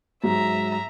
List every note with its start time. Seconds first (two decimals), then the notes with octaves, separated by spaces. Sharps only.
0.24 G#2 F#3 E5 A#5